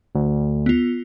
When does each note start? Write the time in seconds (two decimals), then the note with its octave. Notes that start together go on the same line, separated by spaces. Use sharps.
0.15 D2
0.66 B3 F4